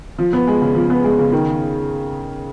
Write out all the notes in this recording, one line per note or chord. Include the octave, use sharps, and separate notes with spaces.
F3
B3
G#3
C#3
F3
B3
G#3
C#3
D#3